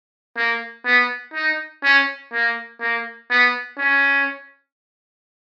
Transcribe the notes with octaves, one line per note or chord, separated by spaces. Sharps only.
A#3
B3
D#4
C#4
A#3
A#3
B3
C#4